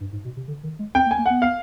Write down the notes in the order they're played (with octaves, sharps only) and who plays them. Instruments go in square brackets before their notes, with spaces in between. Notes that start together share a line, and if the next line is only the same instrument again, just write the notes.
[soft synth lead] G2
G#2
B2
C3
D3
D#3
G#3
[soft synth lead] C4 [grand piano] G5
[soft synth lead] A#3
[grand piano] G#5
[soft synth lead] A#3
[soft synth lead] B3 [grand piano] F#5
[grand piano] F5